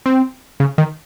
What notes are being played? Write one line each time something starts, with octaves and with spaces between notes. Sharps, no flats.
C4
C#3
D#3